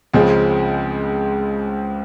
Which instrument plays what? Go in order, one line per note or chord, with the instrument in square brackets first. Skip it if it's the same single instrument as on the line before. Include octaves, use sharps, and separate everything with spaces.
[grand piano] C#2 C#3 F3 C4 [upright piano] G#3